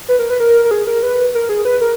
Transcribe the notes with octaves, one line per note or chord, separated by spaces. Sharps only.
B4
A#4
B4
A#4
A#4
G#4
A#4
B4
A#4
G#4
B4
A#4